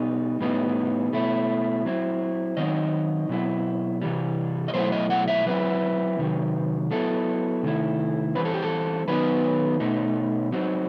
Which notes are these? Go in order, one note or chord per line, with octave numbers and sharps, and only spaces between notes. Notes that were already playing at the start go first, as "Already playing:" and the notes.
Already playing: B2 G3 D#4
A2 G3 B3 D#4
B2 A3 E4
F#3 C4 E4
D#3 F#3 C4 D#4 D#5
B2 F#3 C4 E4
C3 E3 G3
D#5
B2 F#3 A3 E4 C5
D#5
F#5
E5
F#3 C4 E4 B4
C3 D#3 F#3
F#3 B3 E4 A4
C3 D#3 A3 E4
E3 G3 C4 B4
A4
G4
A4
D#3 F#3 B3 D#4 B4
B2 A3 D#4
F#3 C4 D#4